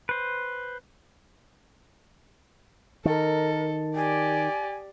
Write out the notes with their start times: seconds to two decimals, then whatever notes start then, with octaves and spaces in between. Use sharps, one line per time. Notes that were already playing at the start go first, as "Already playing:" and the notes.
0.09 B4 C5
3.05 D#3 A4 A#4
3.96 G4 D5 G#5